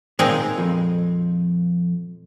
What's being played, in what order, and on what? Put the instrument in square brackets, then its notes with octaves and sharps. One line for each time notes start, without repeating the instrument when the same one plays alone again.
[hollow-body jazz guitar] D#2 D#3 [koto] A#2 G#3 C4 D#4 G#4
[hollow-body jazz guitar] F2 F3